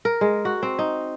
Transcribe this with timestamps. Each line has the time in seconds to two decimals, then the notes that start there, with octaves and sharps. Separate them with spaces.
0.05 A#4
0.21 G#3
0.45 F#4
0.63 C4
0.79 D#4